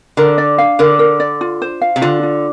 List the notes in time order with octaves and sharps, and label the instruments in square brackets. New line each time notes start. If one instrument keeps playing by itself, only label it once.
[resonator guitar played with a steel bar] D3 [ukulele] A#4
[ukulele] D5
F5
[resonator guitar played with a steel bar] D3 [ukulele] A#4
[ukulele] A#4
D5
F4
C5
F5
[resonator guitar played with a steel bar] C3
[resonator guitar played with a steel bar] D3 [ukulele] F4
[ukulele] F4